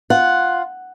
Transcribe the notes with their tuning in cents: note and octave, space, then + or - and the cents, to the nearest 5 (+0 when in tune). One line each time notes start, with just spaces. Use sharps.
F4 +0 F#5 +0